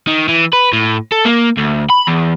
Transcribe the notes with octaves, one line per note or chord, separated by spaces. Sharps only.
D#3
E3
B4
A2
A4
A#3
D2
B5
E2